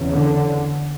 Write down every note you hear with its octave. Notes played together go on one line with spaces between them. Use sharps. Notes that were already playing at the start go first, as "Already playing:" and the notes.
Already playing: E2 C#3
D3